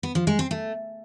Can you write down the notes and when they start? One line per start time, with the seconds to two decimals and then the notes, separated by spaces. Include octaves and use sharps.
0.03 B3
0.15 F3
0.27 G#3
0.39 C4
0.51 A3